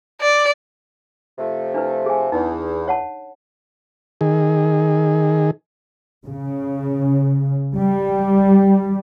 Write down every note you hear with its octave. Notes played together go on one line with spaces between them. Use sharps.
D5
C3 F3 A3
D4 E4 B4
G#4 G#5
E2 D4 D#4
C#5 F#5 A5
D#3 G#4
C#3
G3